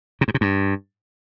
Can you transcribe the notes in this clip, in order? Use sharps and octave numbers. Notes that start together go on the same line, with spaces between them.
C3
G#2
C3
G2